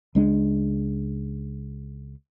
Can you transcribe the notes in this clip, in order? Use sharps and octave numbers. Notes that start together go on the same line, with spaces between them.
C#2 G#3 D4